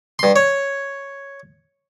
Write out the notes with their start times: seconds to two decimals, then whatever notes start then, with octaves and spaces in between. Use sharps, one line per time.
0.19 G2 C6
0.36 C#5